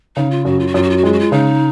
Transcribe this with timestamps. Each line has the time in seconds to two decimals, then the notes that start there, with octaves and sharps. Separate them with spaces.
0.16 C#3 D#4
0.31 F4
0.45 F#2 F#4
0.59 F4
0.67 F#4
0.74 F#2 F4
0.83 F#4
0.90 F4
0.97 F#4
1.03 G#3 F4
1.13 F#4
1.19 F4
1.32 C#3 D#4